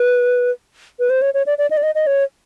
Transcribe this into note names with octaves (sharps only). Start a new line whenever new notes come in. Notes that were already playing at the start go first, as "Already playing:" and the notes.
Already playing: B4
B4
C5
C#5
C#5
D5
D5
D#5
D5
D#5
D#5
C#5